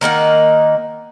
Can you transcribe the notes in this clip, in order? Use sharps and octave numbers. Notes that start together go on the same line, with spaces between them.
D#3 A#3 D#4 F#5